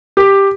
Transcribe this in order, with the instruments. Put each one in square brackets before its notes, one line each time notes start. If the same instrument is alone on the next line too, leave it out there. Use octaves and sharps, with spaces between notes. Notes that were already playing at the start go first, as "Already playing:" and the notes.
[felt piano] G4